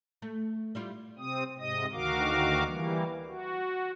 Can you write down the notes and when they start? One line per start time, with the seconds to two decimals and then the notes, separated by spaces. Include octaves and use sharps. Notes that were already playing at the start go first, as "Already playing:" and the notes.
0.22 A3
0.75 G3 E4 F4
1.18 C3 C4 D#6
1.59 G#2 C3 D#5 D#6
1.93 D2 D#3 F#4 A#4 F5 D6
2.64 E3 G3 A#3
3.28 F#4